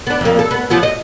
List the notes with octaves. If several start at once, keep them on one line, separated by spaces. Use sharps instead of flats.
B3 D4
F2 A#3
A4
B3
F3 F#3 B3
D#5